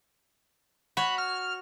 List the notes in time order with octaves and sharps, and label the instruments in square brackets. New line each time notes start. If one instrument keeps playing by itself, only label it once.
[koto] F#4 C#5 [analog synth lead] B5
[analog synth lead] F6